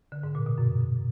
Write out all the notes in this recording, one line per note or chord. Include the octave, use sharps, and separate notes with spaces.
D3
G#2
A#2
B2
F#2